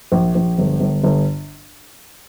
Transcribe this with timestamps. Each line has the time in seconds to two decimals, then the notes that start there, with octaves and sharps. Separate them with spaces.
0.12 A#1
0.35 A#1
0.58 G1
0.80 G1
1.04 G1